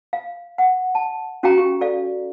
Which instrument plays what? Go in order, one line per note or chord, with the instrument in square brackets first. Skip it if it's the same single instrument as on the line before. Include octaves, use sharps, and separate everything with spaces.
[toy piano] F5
F#5
A5
C#4 F#4 G#4 F5 G5 A#5
G4
A4 D5 F5